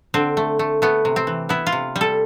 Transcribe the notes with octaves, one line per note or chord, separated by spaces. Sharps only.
D3 C4
A3
A3
A3 B3
C3
C4
E3
B3 E4
F4
C3
G3
A4